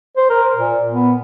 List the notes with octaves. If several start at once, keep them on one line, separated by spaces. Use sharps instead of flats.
C5
A#4
A#2
B3